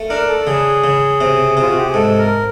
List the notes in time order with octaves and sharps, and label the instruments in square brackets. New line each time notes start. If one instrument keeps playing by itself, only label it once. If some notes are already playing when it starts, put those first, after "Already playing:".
Already playing: [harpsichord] A3
[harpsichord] D4 [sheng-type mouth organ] A#4
[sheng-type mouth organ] A4
[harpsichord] C#3 [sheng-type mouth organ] G#4
[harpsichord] C#3
C3
[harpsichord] C3 [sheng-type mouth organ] F4
[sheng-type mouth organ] F#4
G4
G#4
[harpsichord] G#2 [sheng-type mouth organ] A4
[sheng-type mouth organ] A#4